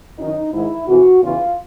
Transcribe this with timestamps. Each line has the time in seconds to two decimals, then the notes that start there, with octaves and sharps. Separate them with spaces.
0.18 F#2 D#3 D#4
0.53 G#2 D#3 E4
0.88 F2 C3 E3 F#4
1.22 E2 C#3 E3 F4